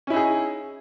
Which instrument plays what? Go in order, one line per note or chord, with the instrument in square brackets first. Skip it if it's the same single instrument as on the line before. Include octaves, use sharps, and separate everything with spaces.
[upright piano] C#4
E4
D#4
G#4